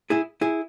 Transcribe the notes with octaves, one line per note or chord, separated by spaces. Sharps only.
E4 G#4
E4 G#4